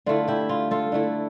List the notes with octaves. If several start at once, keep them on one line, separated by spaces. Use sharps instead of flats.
D3 A3 E4 F4
E4 G4
F4
F4 A4
D3 A3 E4